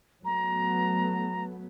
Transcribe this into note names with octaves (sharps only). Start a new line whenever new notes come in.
F#3 A3 B3 A#5